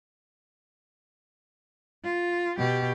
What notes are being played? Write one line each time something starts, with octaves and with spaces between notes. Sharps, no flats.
F4
B2 G4